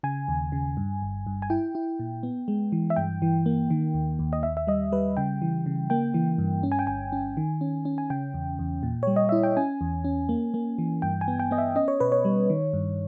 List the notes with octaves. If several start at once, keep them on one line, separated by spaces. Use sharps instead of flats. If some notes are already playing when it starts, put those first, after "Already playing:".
C#3 G#5
D#2
C#3
G2
G1
G2
G#5
E4 G5
E4
A#2
B3
G#3
E3
E5
G2 G5
E3
A#3
D#3
D#2
D#2
D#5
D#2 E5
E5
G3 D#5
G3 B4
C#3 G5
E3
C#3
A#3 G5
E3
G2
C#4
G#5
G5
G1 G#5
C#4
D#3
C#4
C#4
G#5
C#3 G5
E2
E2
A#2
G3 C#5
D#5
E4 E5
G5
C#4 G#5
E2
C#4
A#3
A#3
E3
G2 G5
G#5
B3
G5
B3 D#5
E5
C#4 D#5
C#5
B2 B4
C#5
G3
D#3
G2